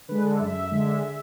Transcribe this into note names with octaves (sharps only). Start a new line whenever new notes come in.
D3 G#3 B4
A4
F#2 E5
D3 G#3